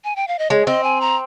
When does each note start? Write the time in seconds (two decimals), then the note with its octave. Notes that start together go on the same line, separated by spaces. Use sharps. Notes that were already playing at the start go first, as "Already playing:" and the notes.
0.04 G#5
0.16 G5
0.28 F5
0.39 D#5
0.50 G#3 C#5
0.66 C4 D#5
0.84 G#5
1.01 A#5